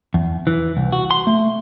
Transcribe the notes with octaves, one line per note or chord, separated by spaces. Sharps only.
E2
E3
C2
F#4
C6
A3